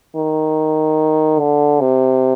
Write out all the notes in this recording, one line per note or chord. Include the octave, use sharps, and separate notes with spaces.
D#3
D3
C3